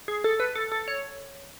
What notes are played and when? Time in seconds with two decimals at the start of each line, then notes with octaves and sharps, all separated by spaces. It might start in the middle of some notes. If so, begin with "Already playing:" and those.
0.08 G#4
0.24 A4
0.40 B4
0.56 A4
0.72 A4
0.88 C#5